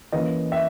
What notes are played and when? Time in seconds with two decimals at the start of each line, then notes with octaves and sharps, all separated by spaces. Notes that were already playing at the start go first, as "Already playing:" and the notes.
0.12 E3 A#3 C#4 D#5
0.52 E5